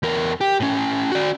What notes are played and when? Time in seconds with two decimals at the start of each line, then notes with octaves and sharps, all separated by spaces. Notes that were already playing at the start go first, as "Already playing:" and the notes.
0.03 E2 A#4
0.41 G4
0.60 A2 C#4
1.12 F#4 D5